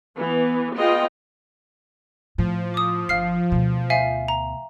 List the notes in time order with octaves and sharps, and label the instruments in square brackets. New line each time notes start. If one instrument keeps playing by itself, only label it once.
[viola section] E3 B3
B3 F4 G#4 D#5 G5
[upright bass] A2 [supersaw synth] F3
[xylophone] D6 D#6
[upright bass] G1 [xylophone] F5 F6 C7
[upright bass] D2 B2
[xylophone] E5 F5 G#5
A#5